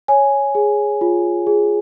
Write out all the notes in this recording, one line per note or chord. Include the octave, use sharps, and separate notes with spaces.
C#5 G#5
G#4
F4
G#4